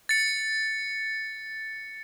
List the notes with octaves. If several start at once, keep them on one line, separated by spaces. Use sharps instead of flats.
A6 C#7